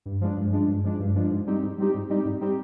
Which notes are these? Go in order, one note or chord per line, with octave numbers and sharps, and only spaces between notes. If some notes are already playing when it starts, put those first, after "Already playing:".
G2
F3 G#3 D4
G2
F3 G#3 D4
G2
F3 G#3 D4
G2
F3 G#3 D4
G#2
G3 C4 D#4 G4
G#2
G3 C4 D#4 G4
G#2
G3 C4 D#4 G4
G#2
G3 C4 D#4 G4